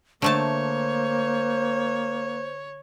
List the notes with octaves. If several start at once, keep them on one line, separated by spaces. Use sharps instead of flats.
D3 A3 A#3 C5 C#5 A5